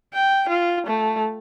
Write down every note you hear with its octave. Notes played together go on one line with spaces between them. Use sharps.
G5
F4
A3